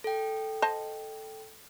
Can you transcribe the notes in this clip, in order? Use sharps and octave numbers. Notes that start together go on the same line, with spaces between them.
A4 G5
C5 D#5 A5